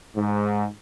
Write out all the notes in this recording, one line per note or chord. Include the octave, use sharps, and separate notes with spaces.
G#2